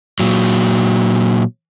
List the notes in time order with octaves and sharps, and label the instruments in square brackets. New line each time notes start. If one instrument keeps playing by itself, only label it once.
[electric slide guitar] A#2 F#3